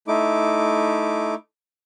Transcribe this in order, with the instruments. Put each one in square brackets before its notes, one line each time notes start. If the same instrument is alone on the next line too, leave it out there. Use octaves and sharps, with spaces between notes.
[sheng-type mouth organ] A3 D#4 E4 D6